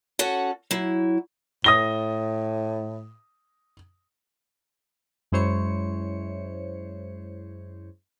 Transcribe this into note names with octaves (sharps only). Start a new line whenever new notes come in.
C#4 F#4 A4 F#5
F#3 E4
A2 D#6 A#6 G7
F#2 G#3 E4 C5 C#5 C#7